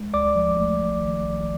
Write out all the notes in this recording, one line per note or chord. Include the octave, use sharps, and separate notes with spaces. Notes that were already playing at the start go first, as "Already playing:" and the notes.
Already playing: G#3
D2 D5 D6
F3
A3
A#1
D#3
A#1